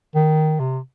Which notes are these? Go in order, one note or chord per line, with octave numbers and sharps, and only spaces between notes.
D#3
C3